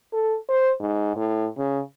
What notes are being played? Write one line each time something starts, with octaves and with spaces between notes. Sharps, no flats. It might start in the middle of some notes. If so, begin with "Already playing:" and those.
A4
C5
G#2
A2
C#3